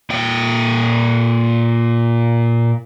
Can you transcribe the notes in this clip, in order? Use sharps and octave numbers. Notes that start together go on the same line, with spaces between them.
A#2 G5